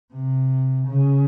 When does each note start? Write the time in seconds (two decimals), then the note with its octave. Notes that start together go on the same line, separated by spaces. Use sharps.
0.13 C3
0.87 C#3